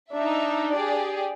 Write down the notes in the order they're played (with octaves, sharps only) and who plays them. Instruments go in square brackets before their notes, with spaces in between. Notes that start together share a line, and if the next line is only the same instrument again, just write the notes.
[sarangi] D4 [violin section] D#4 E5
[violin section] G4 G#4 D5